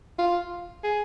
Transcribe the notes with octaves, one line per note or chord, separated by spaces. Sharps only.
F4
G#4